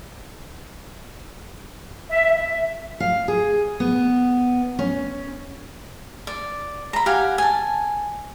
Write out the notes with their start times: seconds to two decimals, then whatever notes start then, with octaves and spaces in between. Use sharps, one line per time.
2.10 E5
2.36 E5
3.00 F5
3.28 G#4
3.80 B3
4.79 C#4
6.27 D5
6.93 A#5 B5
7.06 G4 F5 F#5 G#5
7.38 G#5 A5